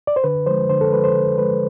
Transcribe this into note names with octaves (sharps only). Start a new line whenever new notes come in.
D5
C5
D3 B4
F3 G#3 C5
D3 C5
A4
F3 G#3 B4
C5
D3
F3 G#3 B4